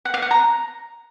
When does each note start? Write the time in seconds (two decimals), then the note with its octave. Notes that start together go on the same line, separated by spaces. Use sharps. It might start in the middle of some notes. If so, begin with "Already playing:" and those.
0.05 F#5
0.14 F5
0.22 F#5
0.31 A#5